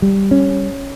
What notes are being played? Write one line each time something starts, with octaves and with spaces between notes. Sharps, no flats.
G3
C#4